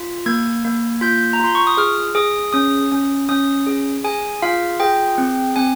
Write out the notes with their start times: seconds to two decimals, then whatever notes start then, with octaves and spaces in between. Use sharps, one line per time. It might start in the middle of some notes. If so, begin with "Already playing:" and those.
Already playing: F4
0.26 A#3 G#6
0.65 A#3
1.01 F4 G6
1.33 A#5
1.40 F4 C6
1.55 C#6
1.67 D#6
1.77 G#4 F6
2.15 G#4 D#6
2.53 C#4 D#6
2.92 C#4
3.29 C#4 D#6
3.67 G#4
4.04 G#4 G#5
4.42 F4 F5
4.80 G#4 G5
5.18 C4
5.56 C4 G#5